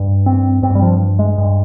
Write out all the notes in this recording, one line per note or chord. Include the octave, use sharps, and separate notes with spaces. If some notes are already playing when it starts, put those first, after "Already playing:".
Already playing: G2
C4
G2 C4
G3
F3
G#3
G2